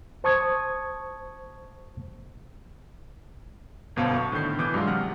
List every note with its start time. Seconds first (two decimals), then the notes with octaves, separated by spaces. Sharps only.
0.24 C5 A5 C#6 D#6 G#6
3.96 G1 F#2 B2 C5 F5 A5
4.16 C#6
4.32 A2 D3 D#3 G6 C7
4.58 B2 E3 D6 D#6 G6
4.74 G2 F#3 G#3 F4
4.87 C3 F#5 F6